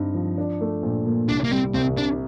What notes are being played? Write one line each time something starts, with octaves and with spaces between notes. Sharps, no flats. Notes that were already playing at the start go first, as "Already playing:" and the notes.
Already playing: G2 C4 D#4
F3
D4
A3
A#1
A#2
C2 D4
A#3
G3 C4
C2 C4
C3 D4